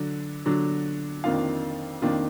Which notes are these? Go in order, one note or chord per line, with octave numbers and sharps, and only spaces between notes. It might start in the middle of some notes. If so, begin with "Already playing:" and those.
Already playing: D3 F#3 D4
D3 F#3 D4
F2 D#3 A#3 D4 F4 F5
F2 D#3 A#3 D4 F4